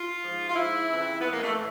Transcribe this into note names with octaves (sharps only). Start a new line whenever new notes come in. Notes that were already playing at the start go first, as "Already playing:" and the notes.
Already playing: F4
G#2 F3
F4
G#2 F3 E4
F2 C#3 E3
F2 C#3 E3 B3
A#3
G#3
A3
A2 E3